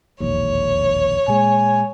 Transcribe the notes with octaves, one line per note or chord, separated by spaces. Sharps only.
E1 A#1 D#2 C#5
A#2 G#3 G#5